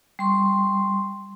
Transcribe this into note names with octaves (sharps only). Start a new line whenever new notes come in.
G3 C6 C#6